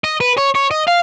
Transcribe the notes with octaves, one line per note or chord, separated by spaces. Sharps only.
D#5
B4
C#5
C#5
D#5
F5